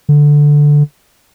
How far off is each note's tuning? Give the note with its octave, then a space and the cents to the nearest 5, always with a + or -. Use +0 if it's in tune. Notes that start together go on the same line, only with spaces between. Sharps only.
D3 +0